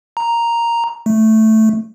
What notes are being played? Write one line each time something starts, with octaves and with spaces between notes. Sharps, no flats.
A#5
A3